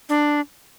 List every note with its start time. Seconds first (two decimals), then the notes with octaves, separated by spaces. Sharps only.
0.09 D4